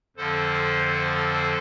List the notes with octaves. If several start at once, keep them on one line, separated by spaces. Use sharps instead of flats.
F2 D3 F3 A4 C5
A4 C5